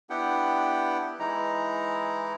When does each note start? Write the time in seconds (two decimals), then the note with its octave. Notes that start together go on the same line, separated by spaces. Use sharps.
0.10 B3 D4 E4 G4 F#5 G5
1.19 E3 G#3 D#4 E4 A#5